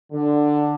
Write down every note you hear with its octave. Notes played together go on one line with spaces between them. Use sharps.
D3